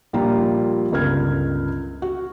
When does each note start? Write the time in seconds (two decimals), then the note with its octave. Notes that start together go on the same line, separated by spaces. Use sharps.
0.13 A#1 G3 A#3 F4 A#5
0.92 G1 C#2 A#4 F6 G#6
2.02 F#4